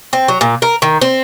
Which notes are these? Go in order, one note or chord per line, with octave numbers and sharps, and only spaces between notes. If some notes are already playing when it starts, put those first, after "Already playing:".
C4
F#3
A#2
A#4
D#3
C4